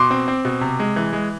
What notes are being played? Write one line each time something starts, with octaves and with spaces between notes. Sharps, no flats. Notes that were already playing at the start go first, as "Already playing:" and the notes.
Already playing: B2 C6 D6
C4
C4
B2
C3
G#3
E3
G#3